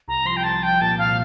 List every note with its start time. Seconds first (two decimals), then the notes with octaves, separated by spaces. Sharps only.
0.08 C2 A#5
0.25 F3 C6
0.37 G5
0.44 C2 A5
0.62 F3 G5
0.81 A#2 A5
0.98 F3 F5